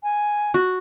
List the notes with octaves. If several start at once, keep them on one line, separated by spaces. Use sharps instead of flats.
G#5
F#4